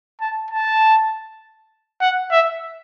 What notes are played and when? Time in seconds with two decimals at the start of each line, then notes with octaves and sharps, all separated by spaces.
0.21 A5
0.51 A5
2.01 F#5
2.31 E5